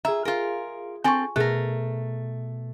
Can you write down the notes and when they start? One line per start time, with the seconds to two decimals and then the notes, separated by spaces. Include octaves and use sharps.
0.05 F4 G#4 E5 A#5
0.25 F4 G#4 A#4
1.04 C4 A4 G#5 C#6
1.36 B2 A3 G#4 A#4 F#6